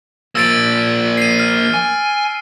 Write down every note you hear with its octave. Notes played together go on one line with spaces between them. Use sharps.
F3 A#3 E6 A6 D7
C7 D#7
F6
G#5